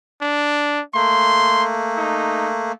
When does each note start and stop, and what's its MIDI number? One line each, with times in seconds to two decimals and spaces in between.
0.22 0.81 62
0.95 2.72 57
0.95 2.72 58
0.95 1.64 84
1.98 2.48 63